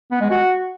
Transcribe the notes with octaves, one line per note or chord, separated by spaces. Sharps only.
B3
G#3
F#4